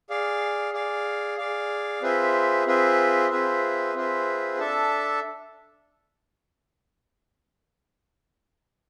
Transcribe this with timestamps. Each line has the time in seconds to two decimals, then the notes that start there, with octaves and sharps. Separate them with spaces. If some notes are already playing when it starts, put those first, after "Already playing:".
0.10 G#4 D5 F5
0.73 G#4 D5 F5
1.38 G#4 D5 F5
2.02 C4 F4 G#4 B4 E5
2.66 C4 F4 G#4 B4 E5
3.31 C4 F4 G#4 B4 E5
3.94 C4 F4 G#4 B4 E5
4.59 D4 A4 E5 A5